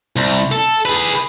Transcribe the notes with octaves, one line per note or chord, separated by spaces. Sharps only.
C2
A4
G#4 B4